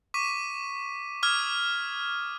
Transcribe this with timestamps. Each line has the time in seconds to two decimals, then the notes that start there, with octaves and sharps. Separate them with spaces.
0.14 C#6 D6 B6 D#7
1.23 D6 D#6 F6 G#6